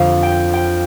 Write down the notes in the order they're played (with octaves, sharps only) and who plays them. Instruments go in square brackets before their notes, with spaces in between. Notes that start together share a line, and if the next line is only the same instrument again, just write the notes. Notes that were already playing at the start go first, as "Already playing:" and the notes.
Already playing: [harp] F2 D3 G3 F5
G5
G5